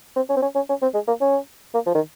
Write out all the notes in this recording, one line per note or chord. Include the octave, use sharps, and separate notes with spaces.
C4
C#4
C4
C#4
C#4
C#4
C4
G#3
A#3
C#4
A#3
F3
D#3